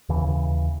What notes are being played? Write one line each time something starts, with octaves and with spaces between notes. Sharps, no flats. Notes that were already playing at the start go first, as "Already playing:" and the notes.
D#2 C#3 E3